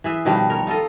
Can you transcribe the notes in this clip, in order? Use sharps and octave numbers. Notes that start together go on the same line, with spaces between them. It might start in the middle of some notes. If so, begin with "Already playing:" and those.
E3 G#4 E5
B2 D#3 F3 G3
A#4 C#5
D#4 F4 A4 D#5